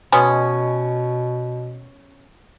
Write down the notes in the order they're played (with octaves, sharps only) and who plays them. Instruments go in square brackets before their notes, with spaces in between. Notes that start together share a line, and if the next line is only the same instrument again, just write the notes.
[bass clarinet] B2 [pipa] G#3 B3 C#4